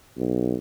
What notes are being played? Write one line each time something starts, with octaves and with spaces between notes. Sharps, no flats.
B1